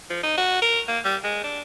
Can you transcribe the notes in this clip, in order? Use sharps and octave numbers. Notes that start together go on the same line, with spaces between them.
F3
D#4
F#4
A#4
A#3
G3
G#3
D4